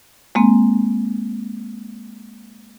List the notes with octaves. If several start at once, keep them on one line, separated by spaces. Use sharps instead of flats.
G#3 A#3 C4